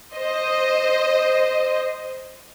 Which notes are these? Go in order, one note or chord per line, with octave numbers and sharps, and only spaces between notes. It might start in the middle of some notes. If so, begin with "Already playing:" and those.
C5 D#5